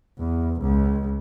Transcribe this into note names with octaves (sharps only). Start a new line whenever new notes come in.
E2
C#2